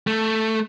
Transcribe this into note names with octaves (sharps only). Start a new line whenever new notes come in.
A3